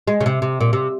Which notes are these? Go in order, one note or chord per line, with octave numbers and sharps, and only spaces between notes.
G#3
C#3
C3
C3
A#2
C3